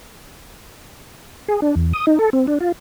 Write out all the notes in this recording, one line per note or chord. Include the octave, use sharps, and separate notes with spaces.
G#4
D4
E2
D#6
D#4
A4
C4
D4
F4